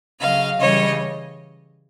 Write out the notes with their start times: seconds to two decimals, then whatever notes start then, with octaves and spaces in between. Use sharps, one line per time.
0.20 C#3 F#3 D#5 F5
0.60 C#3 E3 G3 C#5 D#5